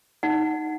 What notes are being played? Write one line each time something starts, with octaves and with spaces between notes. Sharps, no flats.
D#4 F#5